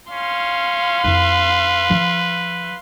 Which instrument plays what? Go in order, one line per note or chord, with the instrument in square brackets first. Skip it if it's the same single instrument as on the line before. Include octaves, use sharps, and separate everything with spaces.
[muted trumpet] C#4 [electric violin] F5 C6
[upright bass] F2 E4 [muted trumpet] B4
[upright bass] F3